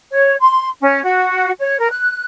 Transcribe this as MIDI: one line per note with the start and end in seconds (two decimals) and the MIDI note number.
0.11 0.35 73
0.40 0.68 84
0.81 1.01 61
1.04 1.51 66
1.60 1.78 73
1.79 1.89 70
1.92 2.25 90